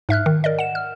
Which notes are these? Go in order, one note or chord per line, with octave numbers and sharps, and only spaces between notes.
G#2 E5 F6 F#6
D#3
A#4 D5 D#5
F#5 E7
F6